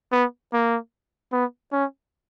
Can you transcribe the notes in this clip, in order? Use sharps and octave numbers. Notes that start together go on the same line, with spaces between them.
B3
A#3
B3
C#4